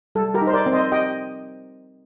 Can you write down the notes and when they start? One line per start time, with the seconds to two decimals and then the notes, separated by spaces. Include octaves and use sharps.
0.15 G3 A4
0.34 G4 A#4
0.41 D#4
0.47 C5
0.53 A#4 D5
0.66 C4
0.73 C5 D#5
0.92 G4 D#5 G5